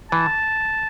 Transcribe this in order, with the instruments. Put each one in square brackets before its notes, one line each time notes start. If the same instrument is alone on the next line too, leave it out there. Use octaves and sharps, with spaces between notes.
[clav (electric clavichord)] E3 [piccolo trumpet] A5